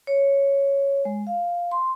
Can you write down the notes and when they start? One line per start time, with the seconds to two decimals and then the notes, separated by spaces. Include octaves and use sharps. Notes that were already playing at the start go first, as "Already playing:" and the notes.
0.07 C#5
1.05 G#3
1.27 F5
1.71 C6